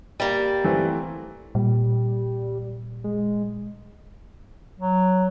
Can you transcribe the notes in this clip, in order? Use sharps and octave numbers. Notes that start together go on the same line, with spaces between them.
G3 A#3
E3 A3 C4
A#2 G3
G#3
F#3